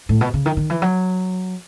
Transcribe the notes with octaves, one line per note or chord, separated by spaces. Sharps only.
A2
B2
C#3
D#3
D#3
E3
F#3